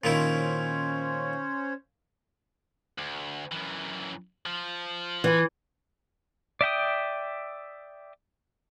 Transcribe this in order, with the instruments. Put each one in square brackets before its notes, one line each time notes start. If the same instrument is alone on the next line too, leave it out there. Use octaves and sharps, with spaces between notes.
[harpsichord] A#2 D#3 E4 [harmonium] C#4 C5 C#5
[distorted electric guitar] D2
F#2 E3
F3
[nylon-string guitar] E3
[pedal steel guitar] D5 E5 G5 D#6